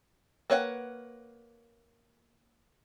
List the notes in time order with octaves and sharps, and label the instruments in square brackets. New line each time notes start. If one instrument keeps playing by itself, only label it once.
[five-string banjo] A#3 B4 C#5 D#5 F#5